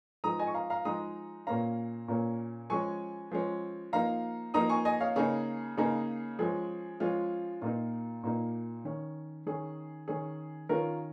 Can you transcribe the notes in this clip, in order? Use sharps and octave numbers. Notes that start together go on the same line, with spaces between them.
F3 G#3 D#4 A#5 D#6
D#5 G#5
C#6
F5 A#5
F5 A#5
F3 G#3 D#4 A#5 D#6
A#2 A#3 C#4 F5 A#5
A#2 A#3 C#4
F3 G#3 C#4 G#5 C#6
F3 G#3 C#4
F3 A#3 D#4 F5 A#5
F3 A#3 D#4 A#5 D#6
G#5 C#6
D#5 G#5
C#5 F5
C#3 A#3 D#4 G#4 C#5
C#3 A#3 D#4 G#4
F3 G#3 C#4 G#4
F3 G#3 C#4 F4
A#2 A#3 D#4 F4
A#2 A#3 D#4
D#3 C#4
D#3 C#4 G#4
D#3 C#4 G#4
D#3 C#4 F4 A#4